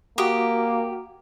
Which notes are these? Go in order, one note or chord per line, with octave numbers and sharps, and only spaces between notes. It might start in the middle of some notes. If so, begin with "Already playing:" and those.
A#3 F#4 G4 D#6